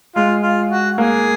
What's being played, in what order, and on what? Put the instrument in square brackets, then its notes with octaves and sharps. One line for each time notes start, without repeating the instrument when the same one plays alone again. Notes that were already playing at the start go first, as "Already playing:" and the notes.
[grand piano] G#3 [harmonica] F4
[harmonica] F4
F#4
[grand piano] A#3 [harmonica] G#4